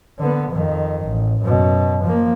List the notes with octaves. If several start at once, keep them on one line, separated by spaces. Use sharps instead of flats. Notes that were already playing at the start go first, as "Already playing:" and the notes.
D3 B3
F2 D#3
A1
F#2 B2
F3 A#3